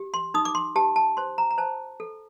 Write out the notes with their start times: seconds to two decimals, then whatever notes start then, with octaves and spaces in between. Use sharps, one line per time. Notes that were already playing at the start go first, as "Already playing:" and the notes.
Already playing: G4
0.14 C6
0.34 D#4 D#6
0.45 D6
0.55 C6
0.76 G4 A5
0.96 A5
1.17 C5 C6
1.38 A#5
1.51 A#5
1.58 C5 A5
2.00 A4